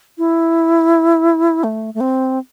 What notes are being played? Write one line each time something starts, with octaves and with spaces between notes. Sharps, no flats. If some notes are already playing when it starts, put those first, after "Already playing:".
E4
A3
A3
C4